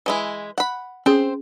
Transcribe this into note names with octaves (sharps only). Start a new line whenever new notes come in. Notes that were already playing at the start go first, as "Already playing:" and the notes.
E3 G#3 E4
F#5 B5
C4 C#4 G#4 C5